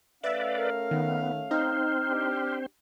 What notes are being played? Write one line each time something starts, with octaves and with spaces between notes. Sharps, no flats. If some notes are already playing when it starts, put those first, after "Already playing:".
A3 C#4 B4 D5 E5 F5
A#4
D#3 B3
C4 D#4 C5 F6
D4 G4